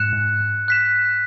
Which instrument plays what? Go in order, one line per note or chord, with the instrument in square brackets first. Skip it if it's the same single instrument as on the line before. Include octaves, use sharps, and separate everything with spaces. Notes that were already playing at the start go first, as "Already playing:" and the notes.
Already playing: [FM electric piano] G#2 [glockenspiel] F#6 C#7 E7
[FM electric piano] G#2
G#2
[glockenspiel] F#6 B6 E7